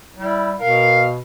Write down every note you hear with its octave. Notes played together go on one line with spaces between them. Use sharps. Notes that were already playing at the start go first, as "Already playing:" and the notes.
G3 E4
B2 A#4 F5